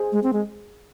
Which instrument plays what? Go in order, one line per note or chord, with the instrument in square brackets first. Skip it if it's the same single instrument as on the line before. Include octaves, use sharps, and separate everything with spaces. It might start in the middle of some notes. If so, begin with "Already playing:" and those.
Already playing: [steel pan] G#4 C5
[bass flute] G#3
C4
G#3